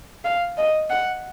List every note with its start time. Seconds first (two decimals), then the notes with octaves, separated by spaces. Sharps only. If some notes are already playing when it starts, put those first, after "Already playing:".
0.24 F5
0.58 D#5
0.90 F#5